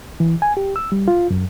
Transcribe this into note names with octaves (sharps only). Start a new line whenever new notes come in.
E3
G#5
G4
E6
G3
F4
F#2